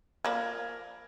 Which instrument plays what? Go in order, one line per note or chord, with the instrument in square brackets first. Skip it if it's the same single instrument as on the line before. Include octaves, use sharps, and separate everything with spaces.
[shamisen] F3 A#3 D5 [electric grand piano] A#4 B5 G#6